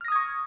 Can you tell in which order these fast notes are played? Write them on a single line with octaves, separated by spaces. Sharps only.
F6 A#6 D#6 G#6 C#6